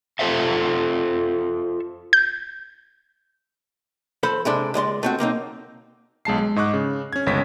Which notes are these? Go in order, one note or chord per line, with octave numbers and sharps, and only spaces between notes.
F4 A4 C5 E5 F5
G6
F3 A4 C5 B5
C3 G#3 D4 A4
C#2 G#3 D5 C6
A3 C4 F#4
B1 A#3 C4 D#4
B1 G#3 A5 C7
G#3
G#2 D#5 C#6 D6 F#6
C#3
C#4 G#6
G1 C#2 C#5 B6